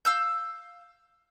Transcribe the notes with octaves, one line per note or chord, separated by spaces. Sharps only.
F5 E6 G6